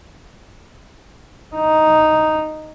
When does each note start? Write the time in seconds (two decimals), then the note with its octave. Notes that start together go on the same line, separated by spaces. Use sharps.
1.56 D#4